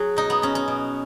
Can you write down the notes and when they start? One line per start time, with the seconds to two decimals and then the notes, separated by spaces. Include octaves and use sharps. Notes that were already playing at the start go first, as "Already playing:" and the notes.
Already playing: F#3 F#4 G#4
0.16 B2 D#4
0.30 B3
0.42 B2 C#4
0.55 C#4
0.68 B2